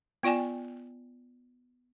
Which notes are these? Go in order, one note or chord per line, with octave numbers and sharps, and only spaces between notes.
B3 F4 D5 G5 G#5